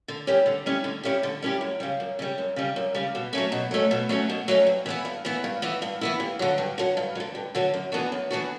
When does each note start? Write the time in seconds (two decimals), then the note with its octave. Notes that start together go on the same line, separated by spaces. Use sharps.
0.08 D3
0.27 G3 C#4 E4 G4
0.46 D3
0.66 G3 C#4 E4 G4
0.84 D3
1.03 G3 C#4 E4 G4
1.23 D3
1.42 G3 C#4 E4 G4
1.61 F#2
1.80 C#3 G3
2.00 F#2
2.19 C#3 G3
2.38 F#2
2.56 C#3 G3
2.76 F#2
2.94 C#3 G3
3.15 B2
3.33 F#3 A3 C#4
3.52 B2
3.71 F#3 A3 C#4
3.91 B2
4.09 F#3 A3 C#4
4.29 B2
4.48 F#3 A3 C#4
4.67 G2
4.86 E3 B3 E4
5.05 G2
5.25 E3 B3 E4
5.44 G2
5.62 E3 B3 E4
5.82 G2
6.01 E3 B3 E4
6.20 G2
6.39 D3 F#3
6.58 G2
6.78 D3 F#3
6.97 G2
7.15 F#3
7.20 D3
7.35 G2
7.55 D3 F#3
7.74 F#2
7.92 E3 B3 D4 F#4
8.12 F#2
8.31 E3 B3 D4 F#4